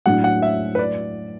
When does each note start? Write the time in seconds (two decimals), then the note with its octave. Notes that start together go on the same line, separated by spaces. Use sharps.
0.06 A2 F#3 D4 F#5
0.24 F#5
0.42 E5
0.75 B4
0.79 D5